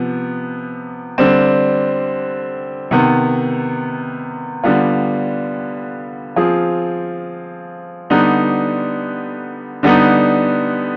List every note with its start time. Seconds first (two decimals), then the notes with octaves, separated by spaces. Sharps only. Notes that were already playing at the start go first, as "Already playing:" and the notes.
Already playing: C3 F3 B3
1.18 D3 G3 C4
2.91 C3 D#3 B3
4.64 D3 G3 B3 F4
6.36 F3 C4 F4 G#4
8.10 D3 G3 B3 D#4
9.83 D3 G3 B3 D#4